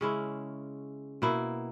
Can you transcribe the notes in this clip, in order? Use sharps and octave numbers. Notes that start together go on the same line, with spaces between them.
C#3 G#3 C#4 E4
B2 A#3 E4